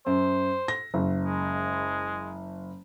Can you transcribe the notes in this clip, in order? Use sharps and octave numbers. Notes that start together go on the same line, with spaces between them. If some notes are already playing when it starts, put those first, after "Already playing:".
F#2 C5
A#6
F#1
G#3